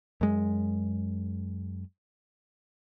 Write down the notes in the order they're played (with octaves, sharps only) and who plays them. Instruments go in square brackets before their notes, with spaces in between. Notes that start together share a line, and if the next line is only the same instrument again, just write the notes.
[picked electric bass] F#2 G#3